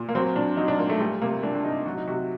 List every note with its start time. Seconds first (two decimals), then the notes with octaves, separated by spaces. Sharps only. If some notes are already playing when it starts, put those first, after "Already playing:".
Already playing: A#2
0.09 A#3
0.15 F#3 C4
0.36 A#2 D4
0.57 F#3 D#4
0.68 D4
0.79 A#2 A#3
0.89 A3
1.00 G3 A3
1.22 C3 A#3
1.43 G3 D4
1.55 D4
1.65 C3 D#4
1.86 F#3 F#4
1.97 D#4
2.07 C3 F#4